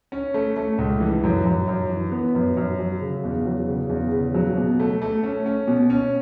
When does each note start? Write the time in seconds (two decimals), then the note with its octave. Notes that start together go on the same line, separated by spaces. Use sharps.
0.12 C#4
0.34 A3
0.56 A3
0.78 C#2
1.00 E3
1.23 F#2
1.45 F#2
1.68 F#2
1.89 E3
2.12 B3
2.35 F#2
2.57 F#2
2.79 F#3
3.01 C#3
3.24 E2
3.45 F#3
3.68 C#3
3.89 E2
4.12 C#3
4.34 F#3
4.57 B2
4.80 A3
5.02 A3
5.23 C#4
5.46 C#4
5.68 B2
5.90 C#4